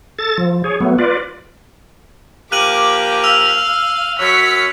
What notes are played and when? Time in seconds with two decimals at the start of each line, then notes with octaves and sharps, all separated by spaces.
0.19 A4 A6
0.38 F3
0.64 G#4 C#5
0.80 F#3 A3 B3
0.99 F4 B4 D5
2.52 F3 A#3 G4 D6 F#6 D#7 F#7
3.24 F5 E6 F6 F7
4.19 F#2 F#3 B6 C#7